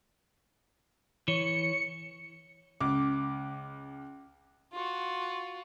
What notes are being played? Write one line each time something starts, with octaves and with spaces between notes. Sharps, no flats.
E3 C#5 C#7
C#2 D6
F4 F#4